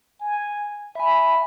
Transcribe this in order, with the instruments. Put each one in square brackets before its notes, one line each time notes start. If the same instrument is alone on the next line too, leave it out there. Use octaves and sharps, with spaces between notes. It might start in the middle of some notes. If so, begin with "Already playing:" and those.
[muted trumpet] G#5
[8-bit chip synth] E5 G#5 [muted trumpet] B5